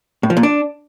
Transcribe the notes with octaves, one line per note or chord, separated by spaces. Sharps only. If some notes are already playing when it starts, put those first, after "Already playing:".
A2
F3
A#2
D4